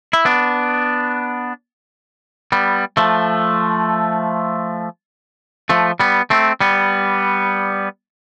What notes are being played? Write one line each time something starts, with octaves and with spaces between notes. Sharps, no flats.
E4
B3 D4
G3 B3
F3 A3
F3 A3
G3 B3
A3 C4
G3 B3